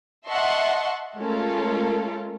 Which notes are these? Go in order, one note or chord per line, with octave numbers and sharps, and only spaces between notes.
D#5 E5 F#5 A5 C6 C#6
G#3 A3 C#4 F4 A4 A#4